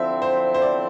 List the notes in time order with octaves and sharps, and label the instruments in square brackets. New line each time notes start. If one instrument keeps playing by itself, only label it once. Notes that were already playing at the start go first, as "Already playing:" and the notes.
Already playing: [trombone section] D3 F3 C4 E4 [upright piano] E5
[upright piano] C5
C5
D5